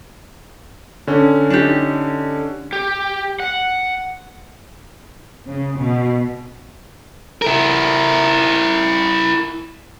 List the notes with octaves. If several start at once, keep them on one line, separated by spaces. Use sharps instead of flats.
D3 C#4
D4 D#4 G4
G4
F#5
C#3
B2
E4 A#4